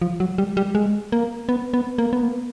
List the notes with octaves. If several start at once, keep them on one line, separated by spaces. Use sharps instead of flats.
F3
F#3
G3
G3
G#3
A#3
B3
B3
A#3
B3
A#3